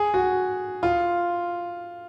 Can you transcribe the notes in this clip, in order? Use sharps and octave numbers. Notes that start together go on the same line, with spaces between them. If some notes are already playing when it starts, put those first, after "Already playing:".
Already playing: G#4
F#4
F4